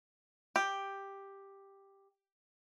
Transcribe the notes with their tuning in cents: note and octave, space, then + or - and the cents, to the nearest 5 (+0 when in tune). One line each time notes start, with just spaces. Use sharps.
G4 +5